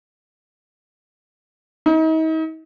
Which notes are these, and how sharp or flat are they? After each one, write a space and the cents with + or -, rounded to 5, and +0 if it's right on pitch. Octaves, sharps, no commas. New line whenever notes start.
D#4 +40